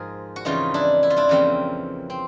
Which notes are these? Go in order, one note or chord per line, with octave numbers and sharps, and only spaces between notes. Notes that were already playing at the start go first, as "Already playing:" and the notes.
Already playing: G#2 F3 G#4 A#4
F#4
F2 C#3 E3 D#4 F4
D4 E4
E4
F4
D4 E4
F2 C#3 E3 A#3 C4
C4